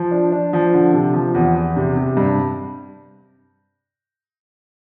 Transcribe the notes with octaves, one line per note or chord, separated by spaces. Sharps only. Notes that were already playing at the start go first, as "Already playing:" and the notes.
Already playing: F3
D4
D4
F3
D3
C3
F3
E2
E2
C3
C3
G2